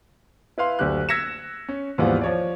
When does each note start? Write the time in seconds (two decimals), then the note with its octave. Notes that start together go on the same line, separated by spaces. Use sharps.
0.58 E4 B4 F5 C6
0.79 F#1 D2 D3 G4 F#6
1.09 E6 G#6 A#6 B6 C#7 E7
1.69 C#4
1.98 D#2 G#2 E3 F3 G3 B3
2.21 F3 C#5 D5